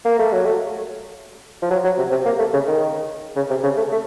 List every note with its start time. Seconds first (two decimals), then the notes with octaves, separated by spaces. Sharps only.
0.05 A#3
0.19 A3
0.32 F#3
0.45 A3
1.62 F3
1.71 F#3
1.84 F#3
1.98 C3
2.11 C3
2.26 A#3
2.39 A3
2.53 C#3
2.67 D#3
3.36 C#3
3.50 C3
3.63 C#3
3.77 A3
3.91 A3